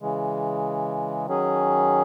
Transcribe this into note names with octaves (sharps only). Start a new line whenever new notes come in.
C#3 E3 G#3
D#3 F#3 C#4 G#4